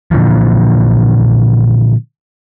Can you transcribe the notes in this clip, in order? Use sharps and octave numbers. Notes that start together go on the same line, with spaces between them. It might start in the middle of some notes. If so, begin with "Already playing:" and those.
A#2 D3 E3 F3